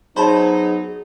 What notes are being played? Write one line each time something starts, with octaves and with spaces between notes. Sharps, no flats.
F#3 B3 D#4 G#4 C5 C#5 A5 B5